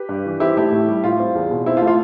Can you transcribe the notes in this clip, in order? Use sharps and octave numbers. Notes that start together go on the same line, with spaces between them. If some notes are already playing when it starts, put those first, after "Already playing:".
Already playing: G4 B4
G2
E3
C4 E4 G4
A3 E4 G4
A2
G3
A2 F4
C4
E2
B2
C4 E4
F4
A3
F4